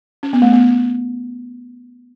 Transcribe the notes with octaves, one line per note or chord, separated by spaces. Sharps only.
C#4
B3
A3
B3